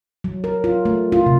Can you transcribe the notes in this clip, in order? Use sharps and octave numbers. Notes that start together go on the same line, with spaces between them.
F#3
A#4
F4
A3
F4
C3